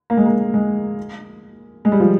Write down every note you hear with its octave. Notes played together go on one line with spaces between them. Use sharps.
A#3
G#3
A#3
G#3
G#3
G3
F3